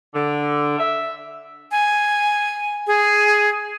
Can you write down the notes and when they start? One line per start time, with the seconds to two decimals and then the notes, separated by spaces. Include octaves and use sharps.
0.13 D3
0.78 E5
1.72 G#5
2.87 G#4